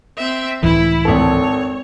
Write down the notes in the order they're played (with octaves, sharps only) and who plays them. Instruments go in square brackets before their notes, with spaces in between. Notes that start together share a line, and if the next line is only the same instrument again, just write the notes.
[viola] C4 E5
[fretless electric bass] C#2 A2 E3 [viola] E4
[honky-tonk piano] G#1 A4 [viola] C#5